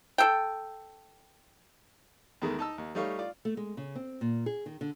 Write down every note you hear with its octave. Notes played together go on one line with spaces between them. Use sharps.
A4 G5
E2 D#3 G#3 A3
D#4 A5 E6
D#2
G3 A3 D#4 C#5 F5
F4 D5
A3
G#3
C#3
C4
A#2
G#4
D#3
D3